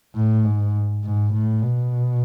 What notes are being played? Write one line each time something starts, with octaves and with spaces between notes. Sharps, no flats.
A2
G#2
G#2
A2
B2